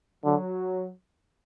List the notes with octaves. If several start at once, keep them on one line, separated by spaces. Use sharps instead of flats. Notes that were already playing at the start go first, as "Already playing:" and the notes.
D3 F#3